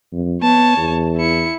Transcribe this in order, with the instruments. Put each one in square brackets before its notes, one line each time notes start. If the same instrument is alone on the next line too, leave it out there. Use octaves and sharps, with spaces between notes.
[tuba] F2
[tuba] B3 [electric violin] C#5 A5
[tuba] E2
[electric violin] E4 C#7